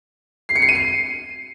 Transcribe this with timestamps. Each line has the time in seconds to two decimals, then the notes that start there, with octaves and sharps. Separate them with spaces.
0.49 C7
0.55 C#7
0.62 C7
0.69 D#7
0.75 C7